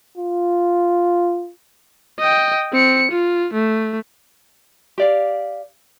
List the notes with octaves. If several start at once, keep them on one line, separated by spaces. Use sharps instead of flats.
F4
D#5 G5
C4 C#7
F4
A3
G4 D5 F5